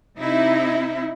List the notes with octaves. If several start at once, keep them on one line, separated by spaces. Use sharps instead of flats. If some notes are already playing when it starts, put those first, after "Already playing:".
C3 D#4 E4